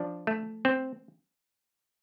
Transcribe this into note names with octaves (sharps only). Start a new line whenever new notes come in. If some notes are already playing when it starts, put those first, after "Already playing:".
Already playing: F3 D4
A3
C4